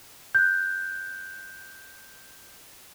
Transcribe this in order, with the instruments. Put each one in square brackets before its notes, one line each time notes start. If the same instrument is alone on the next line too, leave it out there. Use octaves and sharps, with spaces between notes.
[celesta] F#6 G6